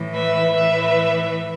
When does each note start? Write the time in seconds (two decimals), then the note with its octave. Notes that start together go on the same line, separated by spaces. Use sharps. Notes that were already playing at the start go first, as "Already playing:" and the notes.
Already playing: A2 E3
0.12 B4 E5
0.55 A2 E3 B4 E5